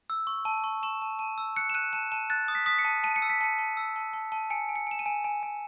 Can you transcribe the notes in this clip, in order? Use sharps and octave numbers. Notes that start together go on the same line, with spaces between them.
E6
C#6
A5
C#6
C#6 E7
A5
A5
E6
F#6 C#7
E7
F#6 D#7
A5 E7
A5 E7
F#6 A6
D#6
B6
D#6 B6
C#7
A5
A5 D#7
C#7
E6
B6
A5 C#7
A5
E6
A5
A5
A5
G#5 C#7
G#5
C#7
G#5 E7
D#7
G#5
G#5
G#5